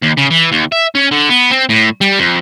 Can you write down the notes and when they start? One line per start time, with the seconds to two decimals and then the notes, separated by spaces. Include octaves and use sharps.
0.02 D#2
0.17 C#3
0.30 E3
0.52 D#2
0.72 E5
0.95 C#4
1.11 D3
1.29 B3
1.51 C4
1.69 A2
2.01 G3
2.19 F2